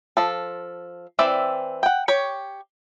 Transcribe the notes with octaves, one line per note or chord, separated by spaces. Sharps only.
F3 A4
E3 C4 D5 E5
F#5 G5
G4 C#5